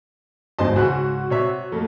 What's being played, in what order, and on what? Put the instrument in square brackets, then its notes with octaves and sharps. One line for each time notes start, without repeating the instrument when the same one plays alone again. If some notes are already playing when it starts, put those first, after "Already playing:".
[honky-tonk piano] G#1 E2 [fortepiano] D#5 A5 C6
[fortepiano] C#2 G#2 F#6 [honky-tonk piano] F#4
[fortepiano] C3 C#5 E5
F2 A3 A#3